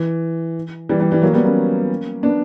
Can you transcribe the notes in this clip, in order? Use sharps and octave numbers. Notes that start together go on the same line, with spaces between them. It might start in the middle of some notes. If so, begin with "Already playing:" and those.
Already playing: E3
E3 G3
E3 G3
E3 G3
F#3 A#3
G3 B3
A#3 C#4
B3 D4